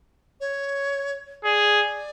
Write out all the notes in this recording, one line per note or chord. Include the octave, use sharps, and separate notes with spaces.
C#5
G#4 D5